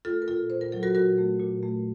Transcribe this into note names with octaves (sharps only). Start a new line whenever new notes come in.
A3 F4 A4
A#4
A#2 F4 A4
A#2 C5
A#4
F#3 A4
F#4 A#4
A#2 F#4 A#4
A3
A#2
A3